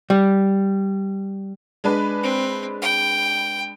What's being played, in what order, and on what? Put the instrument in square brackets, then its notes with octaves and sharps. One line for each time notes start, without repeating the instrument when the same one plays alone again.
[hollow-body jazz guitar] G3
[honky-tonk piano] G#3 D4 B4
[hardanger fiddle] C4
G5